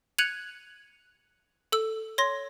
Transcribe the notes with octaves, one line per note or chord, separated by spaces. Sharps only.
F#6 G#6 C#7 D#7 F7 F#7
A4 E6
C#5 C6 A#6